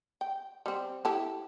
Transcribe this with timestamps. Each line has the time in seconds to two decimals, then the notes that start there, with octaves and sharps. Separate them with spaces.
0.21 G5
0.66 G3 C4
1.05 E4 G4 A4